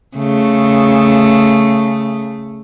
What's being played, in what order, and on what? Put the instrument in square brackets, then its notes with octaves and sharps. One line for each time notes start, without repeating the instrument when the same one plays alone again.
[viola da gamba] C#3 A3